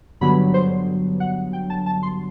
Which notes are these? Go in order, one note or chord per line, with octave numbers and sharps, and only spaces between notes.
G2 D3 F#3 B3 B5
C5
F#5
G5
A5
A5
C6